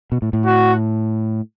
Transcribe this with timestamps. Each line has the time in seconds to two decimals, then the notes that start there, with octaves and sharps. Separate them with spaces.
0.12 B2
0.22 A2
0.33 A2
0.45 F#4